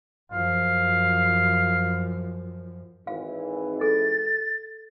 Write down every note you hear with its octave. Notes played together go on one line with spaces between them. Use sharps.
F#2 F3 F5
G#1 G#2 E3 F5
A4 A6